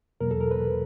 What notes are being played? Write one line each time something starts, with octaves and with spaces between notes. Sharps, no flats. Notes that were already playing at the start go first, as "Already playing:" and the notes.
E2 B2 F#3 A#3 A#4
A4
A#4
B4